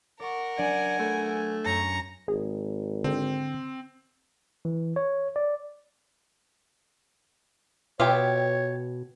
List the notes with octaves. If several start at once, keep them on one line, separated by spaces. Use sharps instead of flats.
A#4 D5 F#5 C#6
F#3 D4 D5 G#5
A3 E5 B5 D7
F#2 A#5 C#6 G#6 C#7
G#1 G#4
D3 C4
E3
C#5
D5
B2 F4 G4 B4 C#5 E5 G5